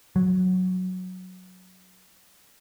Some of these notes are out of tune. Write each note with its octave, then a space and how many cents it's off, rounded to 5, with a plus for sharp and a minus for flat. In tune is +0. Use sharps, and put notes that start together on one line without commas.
F#3 -5